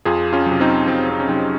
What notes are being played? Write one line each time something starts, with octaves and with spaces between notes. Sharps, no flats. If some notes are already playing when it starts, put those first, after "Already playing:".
F2 F4 G#4
C#4 F4
C3 F#3
C4 D#4
F2 C4
C4
C#4
C3 F#3 C4 D#4